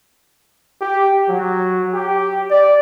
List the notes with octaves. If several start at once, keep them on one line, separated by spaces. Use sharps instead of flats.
G4
F#3
G4
D5